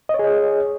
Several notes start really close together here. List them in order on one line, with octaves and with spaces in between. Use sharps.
D#5 C#5 G#4